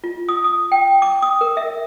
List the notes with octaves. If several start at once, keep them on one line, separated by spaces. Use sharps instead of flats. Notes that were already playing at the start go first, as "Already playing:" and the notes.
F4
D#6
D#6
G5
D6
D#6
A#4
E5